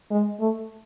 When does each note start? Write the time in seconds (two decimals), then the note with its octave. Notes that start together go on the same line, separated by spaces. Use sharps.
0.11 G#3
0.40 A3